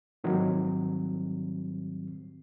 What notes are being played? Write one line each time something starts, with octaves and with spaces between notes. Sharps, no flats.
G#2 D#3 F#3 G3 C4